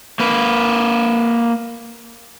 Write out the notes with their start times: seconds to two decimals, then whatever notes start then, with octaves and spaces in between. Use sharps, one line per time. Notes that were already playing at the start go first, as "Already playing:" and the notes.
0.20 A#3 B4